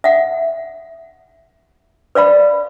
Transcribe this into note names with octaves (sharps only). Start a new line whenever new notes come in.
E5 F#5
B4 D5 F5 B5